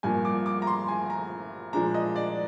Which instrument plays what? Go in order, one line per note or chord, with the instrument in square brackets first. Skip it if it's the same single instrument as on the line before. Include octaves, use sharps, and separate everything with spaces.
[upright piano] G2 F3 A#3 G#5
D6
D6
A#5
C6
G#5
A#5
A#2 F3 G#3 D4 A#5
D#5
D5